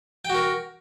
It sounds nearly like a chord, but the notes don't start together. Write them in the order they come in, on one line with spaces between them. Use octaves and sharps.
G5 F#4 A#4